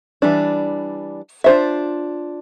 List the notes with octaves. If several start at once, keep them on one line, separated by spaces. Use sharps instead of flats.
E3 G3 D4
D4 F4 C5 E5